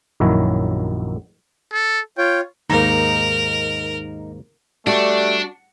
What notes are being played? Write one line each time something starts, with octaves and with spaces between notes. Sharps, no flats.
A#1 F#2 D#3 F#3 E4 C#5
A4
F4 C#5 G5
D#2 G#2 A#3 D#4 A#4
G3 A3 D4 F#4